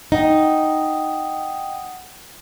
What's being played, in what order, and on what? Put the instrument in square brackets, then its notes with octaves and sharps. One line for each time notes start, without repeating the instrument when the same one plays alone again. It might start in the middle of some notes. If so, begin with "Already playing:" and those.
[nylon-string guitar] D#4 [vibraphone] F#5 G5 D#6